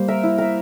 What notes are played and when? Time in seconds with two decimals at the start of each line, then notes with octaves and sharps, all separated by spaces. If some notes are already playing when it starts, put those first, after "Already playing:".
Already playing: G3 A#3 C5
0.08 A#4 E5
0.23 E4
0.38 A#4 E5